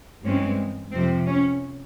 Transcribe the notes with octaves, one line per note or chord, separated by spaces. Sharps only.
G2 E3 G#3 C4 C#4
F2 C3 F3 C4
C#4